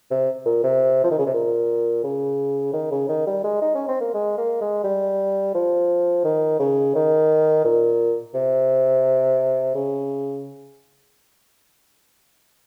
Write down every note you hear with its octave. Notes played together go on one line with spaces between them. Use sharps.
C3
A#2
C3
F3
D#3
C#3
C3
A#2
C#3
D#3
C#3
D#3
G3
G#3
D#4
C#4
C4
A#3
G#3
A#3
G#3
G3
F3
D#3
C#3
D#3
A#2
C3
C#3